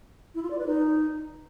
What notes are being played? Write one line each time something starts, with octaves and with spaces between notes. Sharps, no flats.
E4
F4
D5
B4
D#4